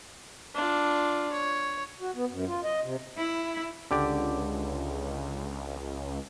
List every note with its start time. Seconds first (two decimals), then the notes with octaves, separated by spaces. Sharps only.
0.54 D4 F4
1.32 C#5
2.01 F#4
2.15 B3
2.30 F#2
2.47 F4
2.64 D#5
2.83 C3
3.17 E4
3.91 C#2 D3 G4 D5